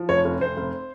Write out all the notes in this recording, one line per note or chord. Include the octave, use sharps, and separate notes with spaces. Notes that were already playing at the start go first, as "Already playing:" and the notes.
Already playing: F3
F1 C#5
F1
F1 C5
F1